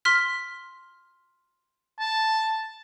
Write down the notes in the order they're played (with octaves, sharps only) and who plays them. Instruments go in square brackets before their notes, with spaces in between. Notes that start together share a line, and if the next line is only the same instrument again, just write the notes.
[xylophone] C6 F6 B6
[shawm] A5